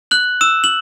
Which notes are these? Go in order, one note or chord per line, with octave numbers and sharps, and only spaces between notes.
F#6 F#7
E6 E7
F#7